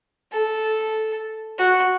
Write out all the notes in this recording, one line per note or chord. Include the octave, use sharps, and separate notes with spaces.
A4
F#4